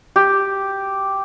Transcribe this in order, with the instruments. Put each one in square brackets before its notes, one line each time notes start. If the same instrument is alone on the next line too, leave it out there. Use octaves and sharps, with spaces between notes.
[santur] G4